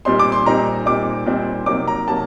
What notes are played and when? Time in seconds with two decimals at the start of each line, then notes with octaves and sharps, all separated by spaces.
0.05 A#2 G3 C4 D#4 C6
0.19 D6
0.32 C6
0.45 A#2 G3 C4 D#4 A#5
0.86 A#2 G3 C4 D#4 D6
1.26 A#2 G3 C4 D#4
1.66 C3 F#3 A#3 D#4 D6
1.87 A#5
2.08 C3 F#3 A#3 A5